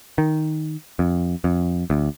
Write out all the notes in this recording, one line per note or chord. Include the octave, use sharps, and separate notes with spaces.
D#3
F2
F2
D2